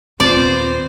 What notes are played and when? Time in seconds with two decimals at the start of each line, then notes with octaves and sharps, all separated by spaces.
0.20 D#2 A#2 B3 C4 F4 C5 D5